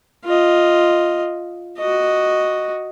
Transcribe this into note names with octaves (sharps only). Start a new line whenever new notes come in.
F4 D#5
F#4 D#5